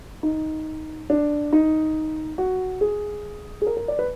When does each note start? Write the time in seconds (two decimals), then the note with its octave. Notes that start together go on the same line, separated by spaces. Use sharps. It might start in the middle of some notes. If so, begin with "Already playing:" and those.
0.23 D#4
1.10 D4
1.53 D#4
2.38 F#4
2.81 G#4
3.62 G#4
3.67 A#4
3.77 A#4
3.88 D5
3.99 B4